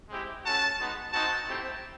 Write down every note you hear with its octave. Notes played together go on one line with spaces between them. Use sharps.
G#3 C4 E4 G4
A3 C#4 F#4 A5
G#3 B3 D#4 F#4
C4 D#4 F#4 A5
A3 C4 E4 G4